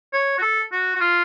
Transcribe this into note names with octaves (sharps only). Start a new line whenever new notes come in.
C#5
F#4
A4
F#4
F#4
F4